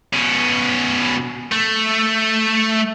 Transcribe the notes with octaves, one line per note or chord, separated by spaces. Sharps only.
B2 C#4
A3